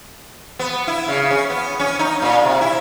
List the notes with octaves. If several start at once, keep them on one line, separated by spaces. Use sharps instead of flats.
B3
E4
C#3
C#4
B3
C#4
D#4
A#2
C3
E4